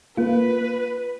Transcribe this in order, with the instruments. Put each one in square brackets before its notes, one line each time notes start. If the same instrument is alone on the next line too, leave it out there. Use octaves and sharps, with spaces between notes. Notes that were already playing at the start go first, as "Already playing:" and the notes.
[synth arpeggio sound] A#3 F4 [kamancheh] B4